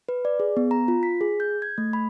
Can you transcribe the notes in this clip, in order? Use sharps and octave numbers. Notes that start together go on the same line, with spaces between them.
B4
D5
G#4
B3
A#5
F4
B6
G#4
G6
G#6
A3
B5